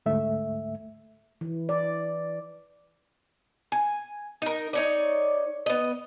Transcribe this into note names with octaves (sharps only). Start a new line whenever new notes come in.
D2 G#2 A3 E5
E3
D5
G#5
D#4 A#4
D#4 C#5 D5
B3 D#5